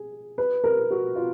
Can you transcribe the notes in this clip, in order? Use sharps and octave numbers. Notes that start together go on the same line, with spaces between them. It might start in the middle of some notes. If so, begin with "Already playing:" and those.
Already playing: G#4
B4
A#4
F#4
F4